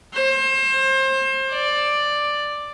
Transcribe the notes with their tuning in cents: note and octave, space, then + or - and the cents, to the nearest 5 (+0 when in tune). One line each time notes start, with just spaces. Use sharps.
C5 +30
D5 +5